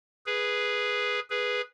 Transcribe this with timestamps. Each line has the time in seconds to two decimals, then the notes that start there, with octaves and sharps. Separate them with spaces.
0.26 G#4 B4
1.30 G#4 B4